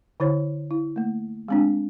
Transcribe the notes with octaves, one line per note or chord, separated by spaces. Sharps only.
D3 E4 C5 C#5
E4
A3 A#3
G#3 C4 D4